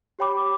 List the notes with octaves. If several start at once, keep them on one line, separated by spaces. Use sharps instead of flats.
G4 C#5 G5 B5 D6